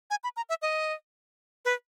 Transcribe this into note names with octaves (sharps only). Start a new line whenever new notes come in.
G#5
B5
A#5
E5
D#5
B4